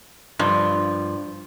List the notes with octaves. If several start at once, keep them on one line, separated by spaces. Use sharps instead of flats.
G2 F3